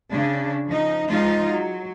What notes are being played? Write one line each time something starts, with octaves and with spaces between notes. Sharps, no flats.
C#3 D4
F3 D#4
F3 G#3 D#4 F4
F#3